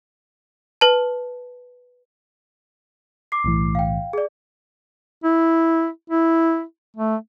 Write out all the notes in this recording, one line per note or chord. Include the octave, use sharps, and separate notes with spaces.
B4 A5
D6 C7
B1 A2 E3
F5 G5
G#4 D5
E4
E4
A3